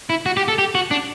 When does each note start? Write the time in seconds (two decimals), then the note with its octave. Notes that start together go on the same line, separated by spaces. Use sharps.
0.10 E4
0.26 F#4
0.37 G4
0.48 A4
0.58 G4
0.75 F#4
0.91 D4